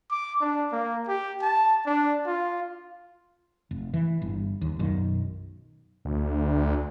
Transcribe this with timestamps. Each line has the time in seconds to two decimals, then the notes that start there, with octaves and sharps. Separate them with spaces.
0.11 D6
0.41 D4
0.72 A#3
1.08 G4
1.42 A5
1.86 D4
2.26 F4
3.71 F1
3.94 E3
4.22 G1
4.61 D#2
4.79 B1 F#2 B2 D#3
6.05 D2